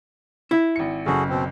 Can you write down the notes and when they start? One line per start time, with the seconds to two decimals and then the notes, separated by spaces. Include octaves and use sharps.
0.51 E4
0.76 G#1 C#7
1.06 F#1 C#3 F#4 G#4 A4
1.29 B2 C4